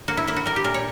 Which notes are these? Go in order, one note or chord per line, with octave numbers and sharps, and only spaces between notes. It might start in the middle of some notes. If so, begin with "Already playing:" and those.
A#3 F#4
E4
A#3 E4
F#4
G3 A#4
G4
A#2 A#4
C#5